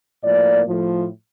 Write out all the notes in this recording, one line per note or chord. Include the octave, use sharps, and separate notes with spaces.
A2 F3 A#3 D5
A2 F3 A3